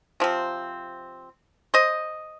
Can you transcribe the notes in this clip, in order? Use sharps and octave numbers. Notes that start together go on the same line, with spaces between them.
C3 F3 C4
C5 D#5